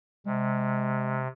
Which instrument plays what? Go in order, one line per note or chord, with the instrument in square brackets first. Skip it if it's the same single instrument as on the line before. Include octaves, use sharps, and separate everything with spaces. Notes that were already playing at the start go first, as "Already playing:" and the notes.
[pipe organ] C3 [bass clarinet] G#3